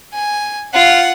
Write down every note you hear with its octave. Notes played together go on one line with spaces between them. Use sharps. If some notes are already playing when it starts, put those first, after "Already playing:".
G#5
F4 F#5